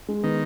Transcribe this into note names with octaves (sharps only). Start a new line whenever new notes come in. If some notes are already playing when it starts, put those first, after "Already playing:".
G#3
D#3 B3